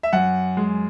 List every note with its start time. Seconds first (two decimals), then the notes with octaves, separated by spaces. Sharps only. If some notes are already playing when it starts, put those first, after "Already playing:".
0.03 E5
0.13 F#2 F#5
0.57 G#3